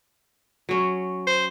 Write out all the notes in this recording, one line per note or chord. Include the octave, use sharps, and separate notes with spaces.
F#3 C#4
C5